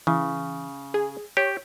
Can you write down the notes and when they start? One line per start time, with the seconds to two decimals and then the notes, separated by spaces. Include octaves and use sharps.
0.07 C#3 E3
0.94 G#4
1.37 G4 C#5